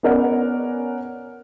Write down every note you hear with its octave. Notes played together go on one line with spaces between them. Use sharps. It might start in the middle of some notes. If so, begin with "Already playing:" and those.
B3 C#4 A#4 D5 F#5